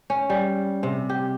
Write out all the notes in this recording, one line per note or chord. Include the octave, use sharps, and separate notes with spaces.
C#4
G3
C3
G4